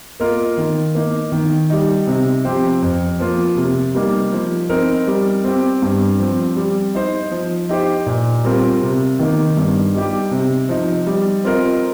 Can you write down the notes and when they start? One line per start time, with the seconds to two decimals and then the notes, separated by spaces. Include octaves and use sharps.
0.20 A#3 F4 A#4 D#5
0.57 D#3
0.95 A#3 D#4
1.32 D#3
1.70 G3 D#4
2.07 C3
2.45 F3 C4 G4 C5
2.82 F2
3.19 F3 A#3 F4
3.57 C3
3.95 G3 A#3 D#4
4.33 F3
4.69 C4 D#4 A#4
5.07 G3
5.44 C4 G4
5.82 G2
6.19 F3 C4
6.56 G3
6.95 D#4 C5 D#5
7.31 F3
7.69 D#4 G4 C5
8.06 A#2
8.44 G3 C4 F4 A#4
8.81 C3
9.19 D#3 A#3 D#4
9.57 G2
9.94 G3 D#4 G4
10.31 C3
10.69 F3 D#4
11.07 G3
11.44 C4 F4 A#4 D#5